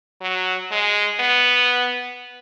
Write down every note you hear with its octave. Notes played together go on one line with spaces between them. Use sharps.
F#3
G#3
B3